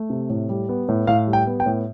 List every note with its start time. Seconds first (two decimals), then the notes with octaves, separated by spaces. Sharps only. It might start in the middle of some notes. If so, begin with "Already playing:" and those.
Already playing: A3
0.10 C3
0.30 A2
0.49 G3
0.69 B3
0.89 A2
1.07 A2 F5
1.27 G3
1.33 G5
1.47 B3
1.60 G5
1.66 A2